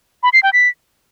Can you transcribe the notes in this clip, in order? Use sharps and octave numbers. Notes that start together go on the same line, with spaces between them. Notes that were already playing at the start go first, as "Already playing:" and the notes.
B5
C7
G5
B6